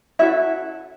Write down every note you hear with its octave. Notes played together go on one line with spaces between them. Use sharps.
C#4 E4 F#4 A4 E5